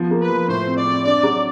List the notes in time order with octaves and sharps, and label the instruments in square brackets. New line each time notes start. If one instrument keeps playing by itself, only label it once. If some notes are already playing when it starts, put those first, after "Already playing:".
Already playing: [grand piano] F3 B3
A#3
[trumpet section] B4
[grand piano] F3
[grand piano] A2 [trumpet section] C5
[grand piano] C4
[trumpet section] D5
[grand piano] C4
[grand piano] D4 [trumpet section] D5
[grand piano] F#3